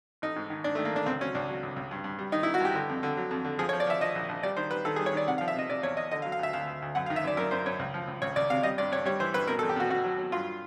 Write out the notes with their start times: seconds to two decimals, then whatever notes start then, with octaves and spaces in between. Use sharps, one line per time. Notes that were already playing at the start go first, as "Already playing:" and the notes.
0.22 A1 D#4
0.36 G#2
0.50 D#3
0.64 G#2 D4
0.75 A3
0.78 D#3
0.85 A#3
0.93 A1 D4
1.06 C#2 C4
1.21 F#3 C#4
1.35 C#2 D4
1.49 F#3
1.63 C#2
1.76 C#2
1.91 G2
2.04 G2
2.19 G3
2.32 D#3 D#4
2.43 E4
2.47 D#3
2.54 F#4
2.60 G2 G4
2.75 D3
2.89 F2
3.03 D3
3.17 F#3
3.31 F2
3.45 D3
3.59 F3 G#4
3.69 C#5
3.73 F3
3.80 D5
3.87 F3 E5
4.01 F3 D#5
4.15 A#1
4.29 A#1
4.43 G3 D5
4.57 D#3 C5
4.71 G3 B4
4.85 D#3 A4
4.96 G#4
4.99 G3
5.06 C#5
5.13 D#3 D5
5.27 C3 F#5
5.38 F5
5.41 F3
5.48 E5
5.55 C3 D#5
5.69 C3 D5
5.83 E2 C#5
5.97 E2 D#5
6.11 D3 D#5
6.22 F5
6.25 F#3
6.32 F5
6.39 D2 E5
6.53 D2 F5
6.67 D2
6.82 D2
6.95 F#2 F#5
7.06 F5
7.10 D#3
7.16 E5
7.24 F#2 D5
7.37 F#2 A#4
7.51 F#2 C5
7.66 F#2 C#5
7.79 C#2
7.94 F3
8.08 C#2
8.22 C#2 C#5
8.36 C#2 D5
8.50 C3 F5
8.63 G3 D#5
8.78 G2 D5
8.92 G2 C#5
9.05 G3 C#5
9.20 E3 C5
9.34 G2 B4
9.47 B2 A#4
9.59 A4
9.63 E2
9.69 G4
9.76 B2 F#4
9.90 B2 F#4
10.04 F#3
10.18 F#3
10.32 G2 F4